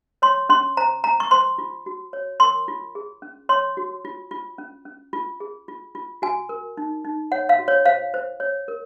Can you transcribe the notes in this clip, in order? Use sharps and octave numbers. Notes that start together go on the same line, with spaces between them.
C#5 C6
C#4 C6
C5 A#5
C5 A#5
C#6
C5 C6
F4
F#4
C#5
A#4 C6
F4
G#4
C#4
C#5 C6
F#4
F4
F4
C#4
C#4
F4
G#4
F4
F4
F#4 G#5
A#4
D#4
D#4
C#5 F#5
F5
F#4
C#5
C5 F5
C5
C#5
A#4